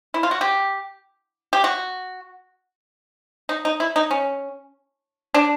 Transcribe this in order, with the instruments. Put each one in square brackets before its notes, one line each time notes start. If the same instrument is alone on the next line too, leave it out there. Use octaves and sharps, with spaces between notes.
[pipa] E4
F4
F#4
G4
G4
F#4
D#4
D#4
E4
D#4
C#4
D4